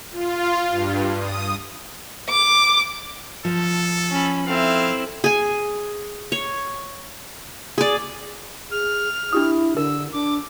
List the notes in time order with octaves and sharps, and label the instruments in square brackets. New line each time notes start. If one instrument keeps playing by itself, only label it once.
[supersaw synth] F4
G2
D#6
[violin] D6
[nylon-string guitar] F3 [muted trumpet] A4
[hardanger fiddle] C#4 B5
[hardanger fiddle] C4 E4 [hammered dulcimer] A4 E5 [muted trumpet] F5
[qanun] G#4 G#5
C#5
G#4 D5
[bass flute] G#4 [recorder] F6
[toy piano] D4 G4 D#6 [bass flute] E4
[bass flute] D3 [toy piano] A#4 [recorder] E6
[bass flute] D4 [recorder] D6